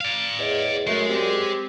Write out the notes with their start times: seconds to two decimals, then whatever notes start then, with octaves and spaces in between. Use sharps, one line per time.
0.01 D5 F5
0.39 E2 G#4 C#5 D#5
0.87 F#2 G#3 A3
1.09 C4 G4 G#4 D5